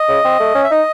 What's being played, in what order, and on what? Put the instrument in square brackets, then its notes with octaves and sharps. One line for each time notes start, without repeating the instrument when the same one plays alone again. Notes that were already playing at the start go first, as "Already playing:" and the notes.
Already playing: [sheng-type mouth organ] D#5
[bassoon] C#3
C4
A3
C#4
[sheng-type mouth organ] E5
[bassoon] D#4 [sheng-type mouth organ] D#5